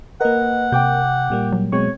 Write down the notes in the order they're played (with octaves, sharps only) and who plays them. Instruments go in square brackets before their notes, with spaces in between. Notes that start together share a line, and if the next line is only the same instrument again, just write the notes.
[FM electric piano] A#3 A#4 [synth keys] B4 D#5 [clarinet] F#5
[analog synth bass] C3 [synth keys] G5 D6 G6
[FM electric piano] A#2 G3 A#3
[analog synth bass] F#3
[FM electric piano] B2 G#3 C#6 [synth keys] C4 [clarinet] C#5